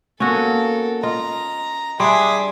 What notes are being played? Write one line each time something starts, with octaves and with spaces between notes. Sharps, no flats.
A#3 B3 C#4 F#4 A4 A#4
F4 D#5 A#5
G3 D4 G#4 E5 G#5 C6 D6 D#6